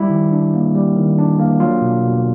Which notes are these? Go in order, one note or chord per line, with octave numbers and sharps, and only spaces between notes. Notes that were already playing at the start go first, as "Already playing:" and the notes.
Already playing: G3 E4
D#3
D4
A#3
G3
D#3
D4
A#3
F#3 F4
B2
B2